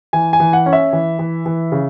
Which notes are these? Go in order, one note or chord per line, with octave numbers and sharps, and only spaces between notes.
E3 G#5
G#5
E3
F#5
C#4
E5
E3
E3
E3
C#3